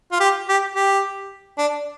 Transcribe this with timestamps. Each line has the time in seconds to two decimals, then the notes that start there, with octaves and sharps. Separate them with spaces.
0.12 F4
0.20 G4
0.48 G4
0.75 G4
1.58 D4